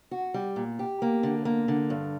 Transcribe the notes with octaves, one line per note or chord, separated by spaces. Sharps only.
F#4
G3
A#2
G4
A#3
D3
A#3
D3
G2